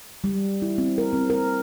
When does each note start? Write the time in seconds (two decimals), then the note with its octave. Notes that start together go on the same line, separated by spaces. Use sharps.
0.24 G3
0.62 E4
0.78 C4
0.98 A#4
1.13 C4
1.30 A#4